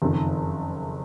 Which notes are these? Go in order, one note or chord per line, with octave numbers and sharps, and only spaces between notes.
F#1 F2 D#3